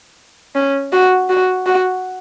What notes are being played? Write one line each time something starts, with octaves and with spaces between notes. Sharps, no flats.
C#4
F#4
F#4
F#4